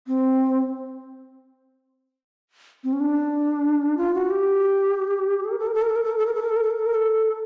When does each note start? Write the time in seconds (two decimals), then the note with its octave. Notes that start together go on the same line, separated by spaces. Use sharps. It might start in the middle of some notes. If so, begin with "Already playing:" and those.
0.07 C4
2.84 C4
2.93 C#4
3.00 D4
3.97 F4
4.14 F#4
4.30 G4
5.44 A4
5.51 A#4
5.59 A4
5.67 A#4
5.74 A4
5.82 A#4
5.89 A4
5.96 A#4
6.04 A4
6.12 A#4
6.18 A4
6.26 A#4
6.35 A4
6.42 A#4
6.49 A4
6.56 A#4
6.63 A4
6.71 A#4
6.79 A4
6.86 A#4
6.94 A4